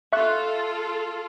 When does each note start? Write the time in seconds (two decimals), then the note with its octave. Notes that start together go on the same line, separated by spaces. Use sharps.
0.13 F4 A4 E5 C#6 F#6